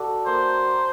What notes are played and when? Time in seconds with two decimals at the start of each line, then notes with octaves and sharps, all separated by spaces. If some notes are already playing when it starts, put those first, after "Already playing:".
Already playing: F#4 A4 D5
0.27 A#3 C5